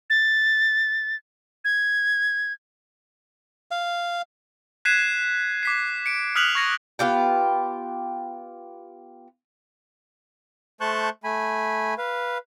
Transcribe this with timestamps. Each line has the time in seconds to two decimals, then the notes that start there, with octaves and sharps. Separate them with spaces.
0.10 A6
1.65 G#6
3.71 F5
4.85 F#6 G#6 B6 C7 D#7 E7
5.63 D6 B6 C7
6.06 C#7 D7
6.35 D#6 F6 F#6 B6 F7 F#7
6.55 C#6 G#6 A#6 C#7
6.99 B3 F4 G4 G5
10.81 A3 C5 A5 C#6 F#6 G6
11.24 A3 G#5 B5
11.98 B4 F5